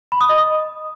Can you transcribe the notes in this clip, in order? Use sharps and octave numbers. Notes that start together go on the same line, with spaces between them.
B5
D#6
D#5
D#6